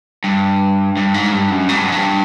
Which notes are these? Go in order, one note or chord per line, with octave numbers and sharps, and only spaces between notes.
G2
G2
G#2
G2
F#2
G#2
G2
F#2
G2